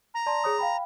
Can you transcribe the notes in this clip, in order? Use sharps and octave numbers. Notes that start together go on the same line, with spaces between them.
A#5
D5 A5 C6
G#4 C#5 D#6
F5 G5 B5